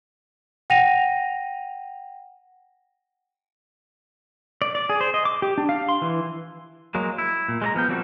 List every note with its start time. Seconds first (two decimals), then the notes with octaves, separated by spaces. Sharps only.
0.70 F#5 G5 A#6 D#7 F7
4.62 D5
4.75 D5
4.89 G#4
5.01 C5
5.14 D#5
5.25 D6
5.42 G4
5.58 D4
5.69 F5
5.89 C6
6.02 E3
6.95 F#3 G#3 A#3
7.18 E4
7.49 A#2
7.62 G#3 D5 A#5
7.75 F3 B3 F5 G5
7.88 F3 G3 A#3 C4 F#4 A4